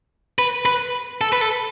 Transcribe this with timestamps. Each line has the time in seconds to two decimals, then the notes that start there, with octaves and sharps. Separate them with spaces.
0.39 B4
0.65 B4
1.21 A4
1.33 B4
1.41 A4